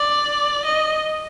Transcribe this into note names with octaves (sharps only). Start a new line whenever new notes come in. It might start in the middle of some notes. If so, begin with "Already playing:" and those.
Already playing: D5
D#5